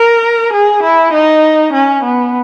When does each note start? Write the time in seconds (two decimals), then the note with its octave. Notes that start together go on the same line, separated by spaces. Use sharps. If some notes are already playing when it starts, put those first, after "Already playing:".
Already playing: A#4
0.53 G#4
0.83 E4
1.13 D#4
1.73 C#4
2.04 B3